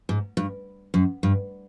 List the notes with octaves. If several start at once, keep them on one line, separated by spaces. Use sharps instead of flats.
G#2
G2
F#2
G2